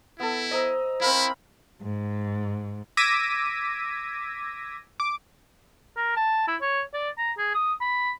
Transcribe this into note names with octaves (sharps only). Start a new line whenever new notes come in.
B3 E4 A4
C5 D#5 A#5 E6
C4 E4 A#4 F5 B5
G#2
D6 E6 G#6 A#6 B6 D#7
D6
A#4
A5
E4
C#5
D5
A#5
G#4
D#6
B5